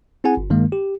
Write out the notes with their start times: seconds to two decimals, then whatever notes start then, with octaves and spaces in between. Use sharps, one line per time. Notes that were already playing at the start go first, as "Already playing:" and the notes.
0.24 C4 E4 G#4 F#5 G#5
0.37 G1
0.50 G2 D#3 G#3 A#3
0.72 G4